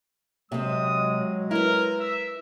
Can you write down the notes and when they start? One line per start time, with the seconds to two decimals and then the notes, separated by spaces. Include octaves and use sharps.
0.52 C3 F#3 G#3 C4 D#6
1.51 E4 A#4 B4
2.00 E5